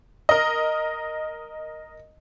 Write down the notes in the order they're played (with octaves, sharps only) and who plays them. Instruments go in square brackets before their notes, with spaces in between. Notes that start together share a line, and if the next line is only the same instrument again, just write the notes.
[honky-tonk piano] A#4 D#5